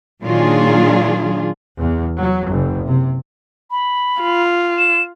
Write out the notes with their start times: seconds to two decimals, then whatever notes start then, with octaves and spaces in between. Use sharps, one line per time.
0.23 A#2 D#3 F#3 D4 F4 G#4
1.78 E2
2.17 F#3
2.49 F#1
2.86 C3
3.71 B5
4.21 F4
4.78 E7